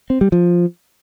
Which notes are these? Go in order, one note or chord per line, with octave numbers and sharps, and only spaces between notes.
C4
G3
F3